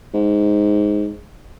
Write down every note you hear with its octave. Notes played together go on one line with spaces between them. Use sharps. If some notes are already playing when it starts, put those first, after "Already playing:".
G#2